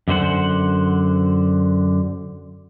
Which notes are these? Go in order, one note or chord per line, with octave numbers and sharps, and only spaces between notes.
F#2 D3 C5 F#5